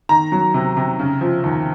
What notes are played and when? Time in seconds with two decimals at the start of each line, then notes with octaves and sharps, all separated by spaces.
0.09 D#3 A#5
0.32 F#3
0.54 C3
0.77 C3
0.99 C#3
1.21 F3
1.44 D#2